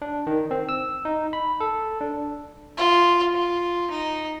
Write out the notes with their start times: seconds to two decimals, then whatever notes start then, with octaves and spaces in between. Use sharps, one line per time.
0.02 D4
0.27 D#3
0.51 C4
0.69 E6
1.05 D#4
1.33 B5
1.60 A4
2.01 D4
2.77 F4
3.34 F4
3.90 D#4